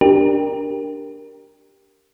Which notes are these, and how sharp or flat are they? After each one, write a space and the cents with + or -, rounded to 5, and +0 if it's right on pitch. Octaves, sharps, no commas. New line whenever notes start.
D4 +0 G4 +0 A#4 +0